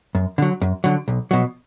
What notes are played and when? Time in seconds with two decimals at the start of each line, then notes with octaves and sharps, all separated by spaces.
0.15 F#2
0.38 D3 F#3
0.61 F#2
0.84 D3 F#3
1.08 B1
1.31 B2 F#3